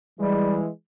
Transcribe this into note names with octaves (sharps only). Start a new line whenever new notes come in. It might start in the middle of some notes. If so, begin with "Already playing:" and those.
E3 G3 G#3